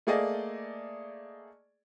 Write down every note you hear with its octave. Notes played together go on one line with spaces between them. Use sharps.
A3 A#3 G#4 D5 D#5